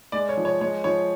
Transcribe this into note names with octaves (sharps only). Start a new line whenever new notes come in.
G#3 D5
C#5
F3
C#5
G#3 C#5
F3 C#5